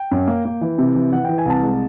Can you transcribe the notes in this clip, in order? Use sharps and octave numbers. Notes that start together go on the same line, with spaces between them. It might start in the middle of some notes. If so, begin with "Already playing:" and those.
Already playing: G5
F#2
A#3
A#3
E3
C3
E3
E3 F#5
E3 G5
G#5
C2 A5
G#3